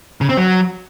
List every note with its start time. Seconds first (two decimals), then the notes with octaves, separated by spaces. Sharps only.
0.21 C#3
0.29 C4
0.37 F#3